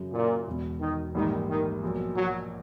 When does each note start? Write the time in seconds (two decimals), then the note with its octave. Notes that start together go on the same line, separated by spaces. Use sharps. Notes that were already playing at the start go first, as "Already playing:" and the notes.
Already playing: F#2 C#3 F#3
0.13 A#2
0.46 E1 E2 B2
0.80 D#3
1.15 A#1 G#2 D#3 E3 G3 A#3
1.49 D#3
1.83 B1 A#2 F3
2.17 F#3